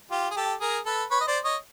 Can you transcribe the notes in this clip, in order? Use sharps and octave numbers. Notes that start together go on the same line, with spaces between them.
F4 G4
G#4
G4 A4
G#4 A#4
A4 B4
B4 C#5
D#5
C5 D5
C#5 D#5